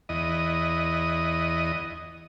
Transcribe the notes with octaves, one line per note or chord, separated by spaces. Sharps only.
E2 D#5